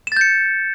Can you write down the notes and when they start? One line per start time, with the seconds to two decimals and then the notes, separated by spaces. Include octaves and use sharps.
0.07 E7
0.12 A6
0.16 G6
0.21 C#7